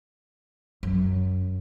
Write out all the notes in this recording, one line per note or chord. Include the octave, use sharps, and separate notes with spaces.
F#2